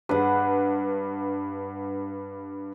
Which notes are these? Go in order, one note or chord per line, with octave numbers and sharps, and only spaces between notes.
G2 B4 F#5